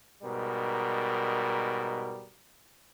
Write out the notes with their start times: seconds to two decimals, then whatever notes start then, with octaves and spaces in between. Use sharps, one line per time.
0.22 G#2 B2 G3 A#4